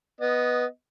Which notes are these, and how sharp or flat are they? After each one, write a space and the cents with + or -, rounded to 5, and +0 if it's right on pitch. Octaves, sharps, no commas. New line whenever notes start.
B3 +0 D#5 +0